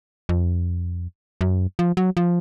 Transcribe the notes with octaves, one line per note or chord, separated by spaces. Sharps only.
F2
F#2
F3
F#3
F3